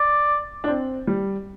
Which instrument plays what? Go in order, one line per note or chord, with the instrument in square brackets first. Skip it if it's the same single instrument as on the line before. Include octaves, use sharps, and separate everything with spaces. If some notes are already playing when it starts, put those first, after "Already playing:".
Already playing: [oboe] D5
[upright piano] D4
C4
G3